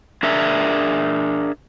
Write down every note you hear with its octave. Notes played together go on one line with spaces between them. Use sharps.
D4 G#4 A#4 E5